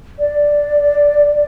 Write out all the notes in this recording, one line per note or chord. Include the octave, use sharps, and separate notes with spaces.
D5